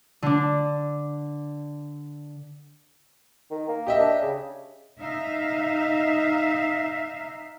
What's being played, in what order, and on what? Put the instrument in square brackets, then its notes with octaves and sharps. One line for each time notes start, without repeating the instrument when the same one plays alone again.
[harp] D3 D4
[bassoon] D#3
A#3
[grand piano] G4 D#5 E5
[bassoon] D4
C#3
[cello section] D#4 E5 F5